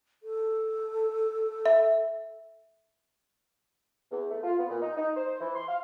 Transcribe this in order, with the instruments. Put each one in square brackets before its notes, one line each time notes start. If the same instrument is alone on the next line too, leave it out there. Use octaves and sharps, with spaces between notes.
[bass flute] A4
[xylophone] E5
[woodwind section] E2
A3
F4
B3
A#2
D#4
D#4
C5
E3
C6
F5